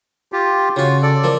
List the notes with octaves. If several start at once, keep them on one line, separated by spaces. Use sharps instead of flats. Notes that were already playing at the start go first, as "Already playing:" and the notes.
F4 G4
C#3 F4 F#4
A4 D5
F3 A#3